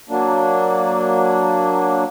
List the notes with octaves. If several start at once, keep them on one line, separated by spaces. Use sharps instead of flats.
F#3 A#3 D4